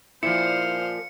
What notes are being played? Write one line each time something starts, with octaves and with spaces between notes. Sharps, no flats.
A#2 F3 E4 C5 F5 C#7